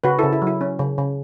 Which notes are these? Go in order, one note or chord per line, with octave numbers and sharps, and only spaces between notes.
C#3 F#4 B4
E4 A4
C#3
E4
F#3
E4
C#4
C#3
C#3